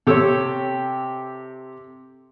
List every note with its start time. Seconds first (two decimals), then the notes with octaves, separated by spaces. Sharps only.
0.07 C3 G4 A4 C#5 E6